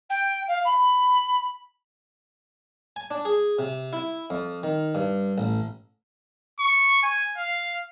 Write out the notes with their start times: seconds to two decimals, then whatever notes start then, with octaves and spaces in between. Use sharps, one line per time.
0.10 G5
0.48 F5
0.65 B5
2.96 G#5
3.11 D4
3.25 G#4
3.59 C3
3.93 E4
4.30 F2
4.63 D#3
4.95 G2
5.38 A1
6.60 C#6
7.03 G#5
7.37 F5